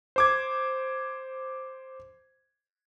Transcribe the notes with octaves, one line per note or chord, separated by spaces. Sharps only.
C5 D6 G#6